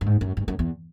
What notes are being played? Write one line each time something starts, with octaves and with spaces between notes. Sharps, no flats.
G2
G#2
F#2
G2
F#2
E2